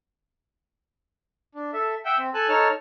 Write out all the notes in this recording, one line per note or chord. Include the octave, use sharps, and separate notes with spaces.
D4
A4 E5
E5 F#5 G5 E6 G6
C4
A4 G#5 A5 F#6
D#4 A4 C#5 A5 F6